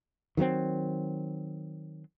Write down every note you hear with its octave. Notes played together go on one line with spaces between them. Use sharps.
D#3 F#3 G#3 C4